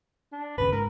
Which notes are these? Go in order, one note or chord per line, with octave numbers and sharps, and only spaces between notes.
D4
G1 D#2 C#3 B4
G#2 A#4